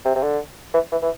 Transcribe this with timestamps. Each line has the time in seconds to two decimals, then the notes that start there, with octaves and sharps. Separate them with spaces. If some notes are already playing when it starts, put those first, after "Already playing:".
0.05 C3
0.15 C3
0.23 D3
0.74 E3
0.92 E3
1.02 E3